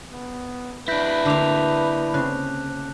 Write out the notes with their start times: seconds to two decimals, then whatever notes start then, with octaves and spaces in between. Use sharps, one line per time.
0.12 B3
0.88 D4 E4 B4 G6 A#6 B6
1.25 D3 A#3 A5 D6 F7
2.14 C#3 C4 F#6